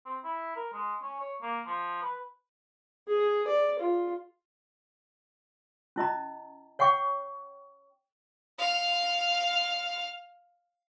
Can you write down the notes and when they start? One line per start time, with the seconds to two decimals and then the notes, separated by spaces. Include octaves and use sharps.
0.05 C4
0.24 E4
0.56 A#4
0.73 G#3
1.02 C#4
1.19 C#5
1.42 A#3
1.66 F3
2.02 B4
3.08 G#4
3.47 D5
3.79 F4
5.96 C#4 E4 D#5 A#5
6.79 C#5 F#5 G5 C#6
8.59 F5 F6